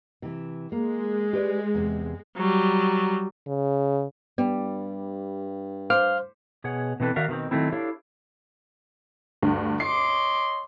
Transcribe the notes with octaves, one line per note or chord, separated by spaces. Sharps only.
C3 E3
G#3 A#3
G4 B4 D5
E2 C3
F#3 G3
C#3
G2 G3 B3
C5 F5 C6 D6 F6
B2 G#4 C#5 F#5
B2 E3 C4 A4 B4
D#3 F#4 A#4 D5 E5 F5
B2 D#3 C4
D#3 F3 F#3 A3 C4 E4
D4 E4 G4 A4 C#5 F5
D2 G2
C#5 D#5 C6 D6 C7